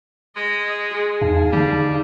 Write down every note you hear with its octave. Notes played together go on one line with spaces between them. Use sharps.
G#3 D#5
G#4
E2 D#4 F5 A5
D3 G3